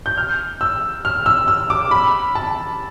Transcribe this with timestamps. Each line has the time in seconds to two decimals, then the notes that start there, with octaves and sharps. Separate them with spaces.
0.06 G6
0.17 F6
0.61 E6
1.05 F6
1.26 E6
1.48 E6
1.70 D6
1.91 B5
2.35 A5